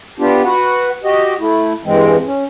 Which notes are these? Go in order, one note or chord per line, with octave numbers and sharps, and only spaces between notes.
B3 D4 F4 G4
F#4 B4 F#5
F#4 G4 D#5
A3 E4
G2 E3 G#3 C4
C#4